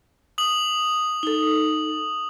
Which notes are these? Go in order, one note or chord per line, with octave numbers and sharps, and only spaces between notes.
D#6 F#7
D#4 A4